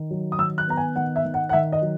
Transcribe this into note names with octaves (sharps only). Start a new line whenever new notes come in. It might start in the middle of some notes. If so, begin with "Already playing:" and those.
Already playing: D#3
F#3
D#6
D#3 E6
F#6
B3 A#5
G#5
D#3 F#5
E5
D#3
F#5
F#5
D#3 E5
D#5
F#3